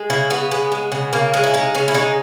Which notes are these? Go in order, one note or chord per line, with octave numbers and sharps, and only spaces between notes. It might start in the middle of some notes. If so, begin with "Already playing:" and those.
Already playing: G#3
C#3 E4
C#3 B3
G#3 B3
G#3
C#3
C#3 A#3
G#3 D#4
E4
G#3 D#4
C#3 C#4
E4
G#3 D#4